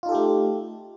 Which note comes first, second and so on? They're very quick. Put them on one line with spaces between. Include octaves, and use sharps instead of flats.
F4 D#4 A4 G4 A3